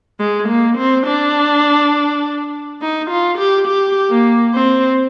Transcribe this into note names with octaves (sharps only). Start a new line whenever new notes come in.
G#3
A#3
C4
D4
D#4
F4
G4
G4
A#3
C4